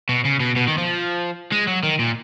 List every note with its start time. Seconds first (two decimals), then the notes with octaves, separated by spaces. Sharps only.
0.09 B2
0.25 C#3
0.40 B2
0.56 B2
0.67 D#3
0.78 F3
1.52 G#3
1.67 F#3
1.83 D#3
1.99 A#2